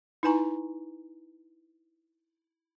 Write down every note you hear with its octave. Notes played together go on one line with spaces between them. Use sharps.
D#4 E4 B4 G#5 A#5 C#6